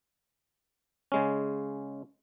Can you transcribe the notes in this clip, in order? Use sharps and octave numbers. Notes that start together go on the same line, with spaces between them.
C#3 G#3 C#4